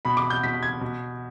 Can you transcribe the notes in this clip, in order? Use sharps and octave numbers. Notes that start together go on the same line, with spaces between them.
B2 B5
D6
G6
B2 B6
G#6
B2